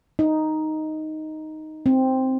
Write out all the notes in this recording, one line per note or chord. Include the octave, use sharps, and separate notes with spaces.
D#4
C4